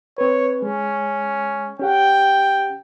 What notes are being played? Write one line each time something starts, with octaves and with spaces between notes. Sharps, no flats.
C4 B4 C#5
G#3 C#4
C#4 G4 F#5 G5